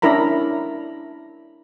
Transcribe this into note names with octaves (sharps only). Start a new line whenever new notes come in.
C#4 D4 E4 A#4 A#5 B5